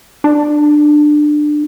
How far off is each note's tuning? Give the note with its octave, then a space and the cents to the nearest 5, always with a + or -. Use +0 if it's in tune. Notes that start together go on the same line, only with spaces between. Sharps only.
D4 +20